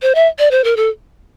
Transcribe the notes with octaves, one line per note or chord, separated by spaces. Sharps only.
C5
E5
D5
C5
A#4
A4